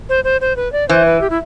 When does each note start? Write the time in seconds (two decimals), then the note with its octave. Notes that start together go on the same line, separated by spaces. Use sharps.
0.09 C5
0.24 C5
0.41 C5
0.56 B4
0.72 D5
0.88 E3 C5
1.06 B4
1.21 G4
1.30 E4